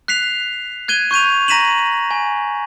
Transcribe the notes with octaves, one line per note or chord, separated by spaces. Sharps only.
F#6 B6 C7 F7
F#6 G#6 D#7 G7
C#6 G6 D#7 F7
A#5 A#6 B6 D#7 E7 F#7
G#5